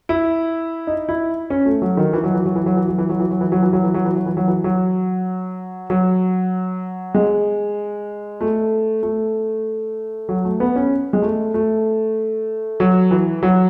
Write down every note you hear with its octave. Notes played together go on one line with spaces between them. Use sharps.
E4
D#4
E4
C#4
A3
F#3
D#3
E3
F#3
E3
F#3
E3
F#3
E3
F#3
E3
F#3
E3
F#3
E3
F#3
E3
F#3
E3
F#3
E3
F#3
E3
F#3
E3
F#3
F#3
G#3
A3
A3
F#3
A3
B3
C#4
G#3
A3
A3
F#3
E3
F#3